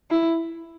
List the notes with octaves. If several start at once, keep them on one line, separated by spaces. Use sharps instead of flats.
E4